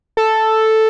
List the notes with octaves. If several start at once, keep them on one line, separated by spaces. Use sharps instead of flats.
A4